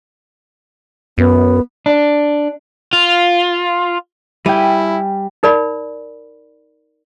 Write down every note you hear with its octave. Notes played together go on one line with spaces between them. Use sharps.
F#2 B3
D4
F4
G3 E4 G5 G#5 D#7
D#4 A#4 D5 B5